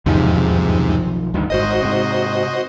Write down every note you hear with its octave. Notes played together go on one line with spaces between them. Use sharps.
B1 E2 G#2 C3 D#3 F3
D2 G2 D#3
G#1 G#2 F#4 C5 D#5
G#2 C3